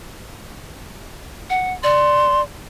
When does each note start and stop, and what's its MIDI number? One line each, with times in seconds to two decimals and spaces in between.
1.50 1.73 78
1.84 2.43 74
1.84 2.41 84